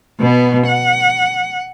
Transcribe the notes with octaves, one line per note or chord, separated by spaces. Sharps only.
B2 B3
F#5